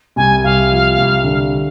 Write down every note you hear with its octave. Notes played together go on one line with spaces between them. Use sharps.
C2 G#5
C2 F5
F3
C2
D3